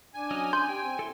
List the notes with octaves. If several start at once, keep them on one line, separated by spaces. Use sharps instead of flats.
D4 G#5
F#3 C#4 D#5
C6 G6
G4 G5
C4
E4 A4 C6